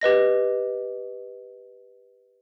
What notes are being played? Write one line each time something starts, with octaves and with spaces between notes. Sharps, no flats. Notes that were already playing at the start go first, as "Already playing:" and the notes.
G4 B4 D#5 A#6